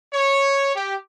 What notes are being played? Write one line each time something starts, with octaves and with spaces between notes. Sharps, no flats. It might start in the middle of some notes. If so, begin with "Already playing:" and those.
C#5
G4